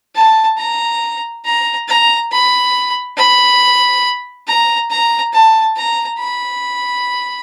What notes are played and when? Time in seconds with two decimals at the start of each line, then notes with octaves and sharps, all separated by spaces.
0.15 A5
0.59 A#5
1.45 A#5
1.88 A#5
2.32 B5
3.17 B5
4.48 A#5
4.90 A#5
5.33 A5
5.76 A#5
6.19 B5